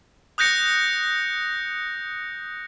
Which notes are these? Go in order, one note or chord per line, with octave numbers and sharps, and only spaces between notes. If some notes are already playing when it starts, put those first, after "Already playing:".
D#6 F#6 G6 A#6 C#7